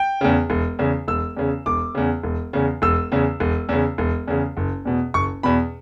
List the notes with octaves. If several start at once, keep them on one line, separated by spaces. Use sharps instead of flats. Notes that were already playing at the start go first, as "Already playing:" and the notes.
Already playing: G5
E2 C#3
E1
E2 C#3
E1 E6
E2 C#3
E1 D6
E2 C#3
E1
E2 C#3
E1 E6
E2 C#3
E1
E2 C#3
E1
E2 C#3
F#1
E2 B2
F#1 C#6
E2 B2 B5